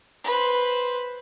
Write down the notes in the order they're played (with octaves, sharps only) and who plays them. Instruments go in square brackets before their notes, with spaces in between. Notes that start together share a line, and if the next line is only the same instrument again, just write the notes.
[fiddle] B4 C5